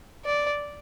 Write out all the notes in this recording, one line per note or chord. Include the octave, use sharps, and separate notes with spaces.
D5